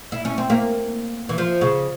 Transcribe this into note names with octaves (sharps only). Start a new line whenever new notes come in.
E4
C#4
C4
A#3
E3
F3
C#3